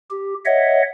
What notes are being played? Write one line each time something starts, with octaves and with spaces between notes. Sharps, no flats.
G4
C#5 D#5 E5 F#5